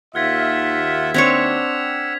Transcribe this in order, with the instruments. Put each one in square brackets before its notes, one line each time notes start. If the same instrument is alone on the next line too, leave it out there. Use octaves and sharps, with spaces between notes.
[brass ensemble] D#2 E5 [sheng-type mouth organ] F4 F#5 [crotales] F6 G#6 B6
[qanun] C4 D4 C#5 [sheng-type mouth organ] F#5 E6 [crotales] G#6 B6 F7